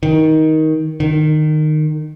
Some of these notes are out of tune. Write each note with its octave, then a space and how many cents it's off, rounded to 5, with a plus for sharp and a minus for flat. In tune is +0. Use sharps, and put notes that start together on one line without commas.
D#3 +15
D#3 -20